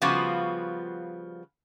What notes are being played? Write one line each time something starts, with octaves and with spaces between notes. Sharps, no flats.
C#3 F3 G3 B3 F4 F#4